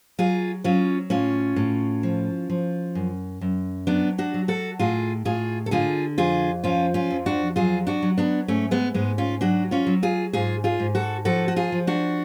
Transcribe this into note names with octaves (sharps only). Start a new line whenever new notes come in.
F#3 F4 G#4
F#3 C#4 F4
A2 C#4 F4
A2
F3
F3
F#2
F#2
F#3 B3 D4
D4 F#4
F#3
F#4 A4
A2 F4 G#4
A2 F4 G#4
A4
D3 F4 G#4
F2 F4 G#4
F3 C#4 F4
C#4 F4
F2
D4 F#4
F#3 F4 G#4
D4 F#4
F#3
B3 D4
G#2 A3 C#4
G#3 B3
G#2 G#3 B3
C#4 F4
F#3 D4 F#4
C#4 F4
F#3
F4 G#4
G#2 F4 G#4
F4 G#4
G#2
F#4 A4
F3 F#4 A4
F#4
F4 G#4
F3
D4 F#4